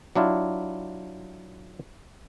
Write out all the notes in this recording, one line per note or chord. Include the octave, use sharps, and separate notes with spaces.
F#3 D4 E4 F4